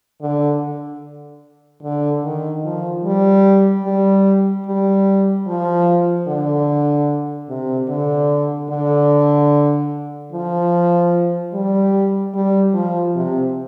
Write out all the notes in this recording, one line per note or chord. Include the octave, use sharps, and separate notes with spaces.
D3
D3
D#3
F3
G3
G3
G3
F3
D3
C3
D3
D3
F3
G3
G3
F3
C3